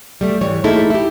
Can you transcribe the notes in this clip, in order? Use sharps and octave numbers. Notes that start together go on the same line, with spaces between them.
G3 A3 G4
G#2 E3 G3 C#5
A3 A#3 D#4 E4 G#4 A4
E4 G4